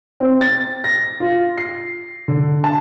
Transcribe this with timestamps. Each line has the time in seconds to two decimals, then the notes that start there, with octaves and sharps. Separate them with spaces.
0.20 C4
0.41 A6
0.84 A#6
1.20 F4
1.58 C7
2.28 D3
2.64 A5